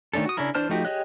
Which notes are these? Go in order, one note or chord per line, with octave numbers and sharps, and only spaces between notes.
D#3 A3 C#4 D4 A4
F#4 D#6
C#3 C#4 D4 E4 A#4
E3 D4 C5 A5 F6
F3 A3 D#4 F#4 G4
G4 G#4 C#5 D#5 F#6